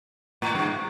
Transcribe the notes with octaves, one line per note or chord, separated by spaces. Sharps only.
A2
G2